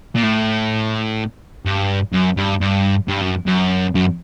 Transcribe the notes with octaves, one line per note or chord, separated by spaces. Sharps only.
A#2
A2
G2
F#2
G2
G2
G2
F#2
F#2
F#2